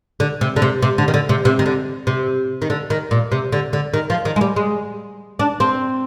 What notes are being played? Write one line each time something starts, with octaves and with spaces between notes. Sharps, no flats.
D3
C3
D3
C3
C3
D3
D#3
D3
C3
C3
D#3
D3
C3
D#3
D3
D#3
A#2
C3
D3
D3
D#3
F3
D#3
G#3
G3
G#3
D4
C4